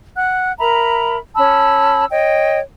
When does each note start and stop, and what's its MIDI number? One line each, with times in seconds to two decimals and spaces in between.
0.15 0.52 78
0.15 0.52 90
0.59 1.17 70
0.59 1.17 76
0.59 1.17 82
0.59 1.17 83
1.36 2.04 61
1.36 2.04 81
1.36 2.04 83
1.36 2.04 88
2.09 2.59 73
2.09 2.59 75
2.09 2.59 79